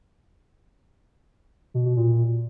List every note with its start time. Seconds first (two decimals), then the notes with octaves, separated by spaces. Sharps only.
1.74 B2
1.85 B2
1.96 A#2